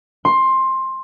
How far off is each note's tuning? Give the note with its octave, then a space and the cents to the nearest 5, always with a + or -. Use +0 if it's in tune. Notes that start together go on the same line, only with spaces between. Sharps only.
C6 +15